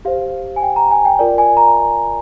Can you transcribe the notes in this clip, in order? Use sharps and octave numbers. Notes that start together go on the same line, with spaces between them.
G4 C5 F5
G#5
G5
A#5
G#5
G5
F4 A#4 D5
G#5
A#5